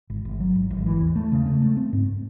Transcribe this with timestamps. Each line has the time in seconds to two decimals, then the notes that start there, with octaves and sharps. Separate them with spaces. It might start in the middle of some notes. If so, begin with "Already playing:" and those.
0.10 G#1
0.25 G#1
0.40 F#3
0.55 G#1
0.71 G#1
0.86 E3
1.01 E2
1.16 A3
1.32 C#3
1.46 A3
1.62 A3
1.77 C4
1.93 G#2